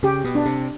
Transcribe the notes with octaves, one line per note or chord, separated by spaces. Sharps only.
C#3 G4
B2
D4
C3